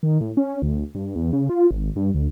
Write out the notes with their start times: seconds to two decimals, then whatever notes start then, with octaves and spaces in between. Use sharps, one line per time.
0.03 D#3
0.21 A2
0.37 C#4
0.62 D2
0.95 G2
1.15 E2
1.33 C#3
1.49 F4
1.71 G#1
1.96 G2
2.14 D2